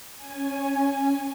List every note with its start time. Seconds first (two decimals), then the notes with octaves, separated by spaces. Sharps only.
0.15 C#4 G#5